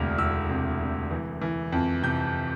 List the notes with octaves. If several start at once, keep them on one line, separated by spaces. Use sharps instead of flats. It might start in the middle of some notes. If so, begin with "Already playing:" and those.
Already playing: E1 D2 C3 F6
E1 E6
C3
C3
E3
E3
F2
C3 G6